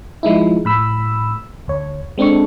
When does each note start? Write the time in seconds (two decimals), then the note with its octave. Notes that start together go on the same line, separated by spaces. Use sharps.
0.23 F3 G#3 D#4 E4
0.65 A2 B5 E6
1.68 D2 C#5
2.18 G#3 C4 D4 A4 C#6